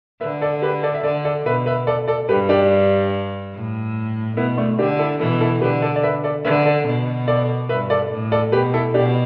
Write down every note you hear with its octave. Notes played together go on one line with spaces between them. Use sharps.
D3 B4 E5
A4 D5
G4 B4
A4 D5
E5
D3 A4 D5
A4 D5
B2 B4 E5
B4 E5
A4 D5
A4 D5
G2 G4 B4
D4 G4
A2
B2 B3 E4
A3 D4
D3 D4 G4
E4 A4
B2 E3 E4 A4
E4 A4
D3 G4 B4
A4 D5
D5
B4 E5
A4 D5
D3 B4 E5
A4 D5
B2
A4 D5
G2 B4 E5
A4 D5
A2
A4 D5
B2 G4 B4
E4 A4
B2 D4 G4